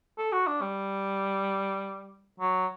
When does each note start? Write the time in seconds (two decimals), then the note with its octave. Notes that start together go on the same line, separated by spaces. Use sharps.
0.18 A4
0.32 F#4
0.47 D4
0.61 G3
2.40 F#3